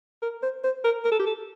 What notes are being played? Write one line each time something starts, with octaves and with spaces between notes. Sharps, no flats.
A#4
C5
C5
A#4
A#4
A4
G4
A4